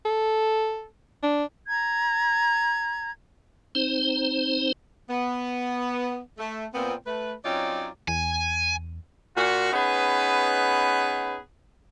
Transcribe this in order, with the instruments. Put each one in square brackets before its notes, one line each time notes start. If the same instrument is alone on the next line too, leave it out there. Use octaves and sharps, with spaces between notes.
[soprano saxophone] A4
D4
[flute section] A#5 G#6
[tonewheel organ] C4 D#4 C5
[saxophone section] B3
A3
A#2 B3 C4
A3 B4
F#3 C4 C#4 D#4 F4 D5
[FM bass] E2 [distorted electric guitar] G#5
[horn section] A#2 F#4
B3 C#4 D#4 G#4 B4